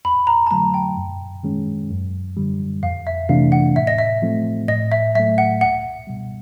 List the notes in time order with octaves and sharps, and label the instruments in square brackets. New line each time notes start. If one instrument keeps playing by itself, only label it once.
[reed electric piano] F2 [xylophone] B5
[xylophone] A#5
A5
[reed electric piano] D3 F#3 A3 [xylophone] A#5
[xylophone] G5
[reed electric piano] F#2
D#3 G#3 C#4
F#2
D3 G3
[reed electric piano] F2 [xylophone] F5
[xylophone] E5
[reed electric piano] C3 E3 A3 D4 [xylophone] F5
[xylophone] F#5
[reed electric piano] A2 [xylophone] E5
[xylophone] D#5
E5
[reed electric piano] F3 A3 C4
[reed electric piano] A2 [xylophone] D#5
[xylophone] E5
[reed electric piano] F#3 A3 [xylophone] E5
[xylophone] F#5
[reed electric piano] C#2 [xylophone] F#5
[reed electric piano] B2 G3